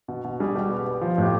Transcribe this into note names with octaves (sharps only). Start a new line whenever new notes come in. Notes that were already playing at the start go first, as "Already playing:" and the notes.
B2
B2
G3 G#4
B2 G4
B3
B3
F3
A2 G4